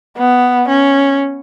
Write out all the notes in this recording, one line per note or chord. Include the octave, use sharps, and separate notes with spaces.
B3
C#4